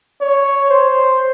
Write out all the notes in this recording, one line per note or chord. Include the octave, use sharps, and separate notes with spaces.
C#5
C5